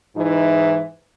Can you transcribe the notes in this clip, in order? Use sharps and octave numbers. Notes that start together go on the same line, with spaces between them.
G#2 E3 D#4 E4